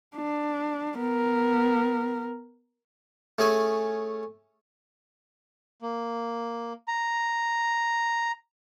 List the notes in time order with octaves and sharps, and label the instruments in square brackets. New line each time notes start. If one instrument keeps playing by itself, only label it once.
[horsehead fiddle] D4
B3 A#4
[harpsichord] A3 C#4 G#4 G#5
[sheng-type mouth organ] A#3
A#5